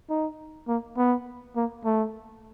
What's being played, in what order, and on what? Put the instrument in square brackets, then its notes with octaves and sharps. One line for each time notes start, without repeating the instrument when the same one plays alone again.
[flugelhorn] D#4
A#3
B3
A#3
A3